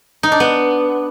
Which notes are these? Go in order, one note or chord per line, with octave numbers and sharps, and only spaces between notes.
D#4
D4
B3